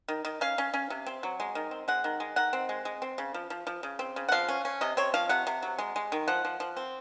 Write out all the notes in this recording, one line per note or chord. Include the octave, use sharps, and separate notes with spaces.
D#3
D#3
C#4 F5
C#4
C#4
C3
C4
F#3
G#3
D#3
C4
G#3 F#5
D#3
G#3
D#3 F#5
C4
G#3
G#3
C4
C#3
F3
F3
F3
C#3
C4
C#3
F#5
F3 F5
C#4
C#4
C3 D#5
C4 C#5
F3 F5
C3 F#5
C3
F#3
G#3
G#3
D#3
F3 F#5
F3
F3
C4